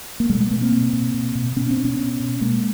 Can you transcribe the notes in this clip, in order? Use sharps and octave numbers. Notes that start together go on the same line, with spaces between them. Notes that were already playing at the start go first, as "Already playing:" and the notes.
A#3
B2 G3 A3
G#3 A#3
B2 A3 B3
A#3 C4
B2
B2
B2
B2
B2 B3 C#4
C4 D4
B2
B3 C#4
B2
B2
B2 G#3 A#3